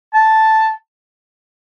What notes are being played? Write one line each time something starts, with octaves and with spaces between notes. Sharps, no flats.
A5